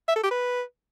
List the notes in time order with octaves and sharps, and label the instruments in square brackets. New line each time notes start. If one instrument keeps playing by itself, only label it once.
[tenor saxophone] E5
A4
G4
B4